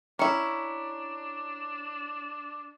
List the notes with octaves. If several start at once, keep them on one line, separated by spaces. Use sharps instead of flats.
C#4 D4 E4 A#5 C#7